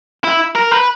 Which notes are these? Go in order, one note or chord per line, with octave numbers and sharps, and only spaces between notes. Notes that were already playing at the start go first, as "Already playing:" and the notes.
E4
A#4
B4